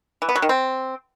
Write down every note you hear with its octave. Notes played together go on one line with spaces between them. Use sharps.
E3
B3
F#3
D#3
C4